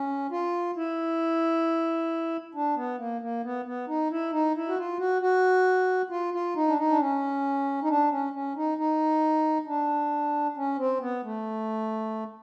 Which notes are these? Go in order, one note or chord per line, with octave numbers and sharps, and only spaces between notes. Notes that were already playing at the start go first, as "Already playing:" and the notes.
Already playing: C#4
F4
E4
D4
B3
A#3
A#3
B3
B3
D#4
E4
D#4
E4
F#4
F4
F#4
F#4
F4
F4
D#4
D4
D#4
D4
C#4
D#4
D4
C#4
C#4
D#4
D#4
D4
C#4
C4
B3
A3